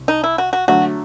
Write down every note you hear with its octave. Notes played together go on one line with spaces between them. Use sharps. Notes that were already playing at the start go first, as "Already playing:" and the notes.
Already playing: C2
D#4
E4
F#4
F#4
D3 F#3 A3 F#4